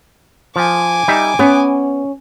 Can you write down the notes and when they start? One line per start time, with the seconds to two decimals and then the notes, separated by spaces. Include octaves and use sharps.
0.56 F3 G#5 D6
1.08 G3 D#4 E5
1.39 B3 C#4